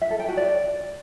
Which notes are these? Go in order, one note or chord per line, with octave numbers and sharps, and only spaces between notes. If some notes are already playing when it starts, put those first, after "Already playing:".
E5
A4
G5
F#4
D5